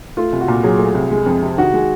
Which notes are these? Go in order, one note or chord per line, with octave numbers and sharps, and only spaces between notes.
A3 F4
C2
F#4
A#2
F#3 G#4
A3
C2
G#3
F2
C3
D#3 F#4
G#3